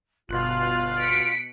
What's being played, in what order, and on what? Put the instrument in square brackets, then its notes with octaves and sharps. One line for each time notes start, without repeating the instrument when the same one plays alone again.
[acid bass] G1 [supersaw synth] B2 F#6 [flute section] F4
[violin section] B6 C#7 D7